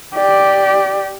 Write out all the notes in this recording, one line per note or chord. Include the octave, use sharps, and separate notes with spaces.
G4 D5